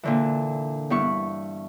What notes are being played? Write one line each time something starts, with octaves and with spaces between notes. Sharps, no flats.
A#2 D3 E3
G2 B3 E4 C#6